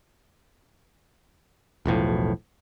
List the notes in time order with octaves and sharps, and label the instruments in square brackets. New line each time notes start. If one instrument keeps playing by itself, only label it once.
[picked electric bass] E1 B1 A2 F3